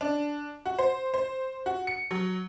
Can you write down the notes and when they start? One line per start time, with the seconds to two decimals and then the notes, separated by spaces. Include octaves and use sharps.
0.01 D4
0.66 F#4
0.79 C5
1.14 C5
1.66 F#4
1.87 C#7
2.11 F#3